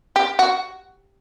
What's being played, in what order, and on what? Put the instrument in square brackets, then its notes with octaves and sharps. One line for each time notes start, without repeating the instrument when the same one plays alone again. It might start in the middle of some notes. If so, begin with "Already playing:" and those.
[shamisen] G4
F#4